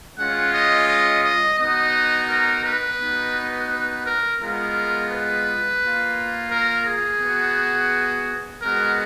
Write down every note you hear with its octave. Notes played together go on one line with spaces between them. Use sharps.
G#3 C#4 F4 F#5
D#5
D#5
D#5
B3 D#4 F#4 D#5
A#4
B4
B3 D#4 F#4
B4
A#4
G#3 B3 F4 A#4
B4
A#3 F4
A#4
G#4
B3 F#4
G#3 B3 F#4 A#4